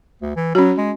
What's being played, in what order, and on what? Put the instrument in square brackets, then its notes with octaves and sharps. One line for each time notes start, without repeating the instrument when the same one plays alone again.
[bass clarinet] D2
E3
[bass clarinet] F#3 [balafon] C#4 F#4
[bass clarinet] G#3